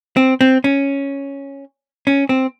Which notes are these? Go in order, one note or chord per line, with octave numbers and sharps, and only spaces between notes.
C4
C4
C#4
C#4
C4